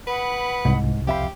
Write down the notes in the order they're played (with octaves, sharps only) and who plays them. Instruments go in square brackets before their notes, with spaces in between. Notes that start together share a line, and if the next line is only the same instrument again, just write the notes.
[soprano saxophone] B4 [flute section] F#5 B5 D#6
[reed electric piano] C2 [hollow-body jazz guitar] G#2
[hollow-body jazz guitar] F2 E5 B5 [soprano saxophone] G4 [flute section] C5 F5